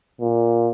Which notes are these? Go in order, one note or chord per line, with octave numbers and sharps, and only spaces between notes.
A#2